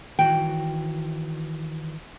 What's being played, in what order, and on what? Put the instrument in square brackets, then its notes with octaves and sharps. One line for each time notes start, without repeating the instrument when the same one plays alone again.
[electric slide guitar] D#3 E3 F#4 [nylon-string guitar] G5